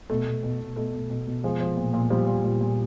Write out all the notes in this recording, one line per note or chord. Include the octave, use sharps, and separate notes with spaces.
B2 A3
B2
B2
B2
B2 A3
B2
B2
B2
F3 G#3
F3
A#2
A#2
F3 G3
F3
A#2
A#2